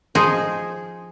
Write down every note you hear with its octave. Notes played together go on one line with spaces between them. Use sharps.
F3 D#4 G#4 C5